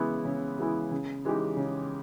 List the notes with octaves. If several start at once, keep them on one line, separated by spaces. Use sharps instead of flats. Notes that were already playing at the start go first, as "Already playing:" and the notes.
Already playing: C#3 E3 G#3 B3 E4
C#3
E3 G#3 B3 E4
C#3
E3 G#3 D#4 G4
C#3